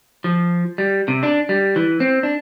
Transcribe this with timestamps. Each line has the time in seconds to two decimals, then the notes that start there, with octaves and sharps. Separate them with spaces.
0.24 F3
0.78 G3
1.08 C3
1.23 D4
1.49 G3
1.76 E3
2.00 C4
2.23 D4